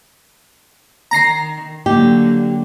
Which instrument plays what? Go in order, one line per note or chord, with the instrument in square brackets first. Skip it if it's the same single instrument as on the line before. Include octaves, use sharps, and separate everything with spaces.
[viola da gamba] D#3 [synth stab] A#5 A#6 C7
[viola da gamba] D3 F#3 A#3 [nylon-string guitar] G4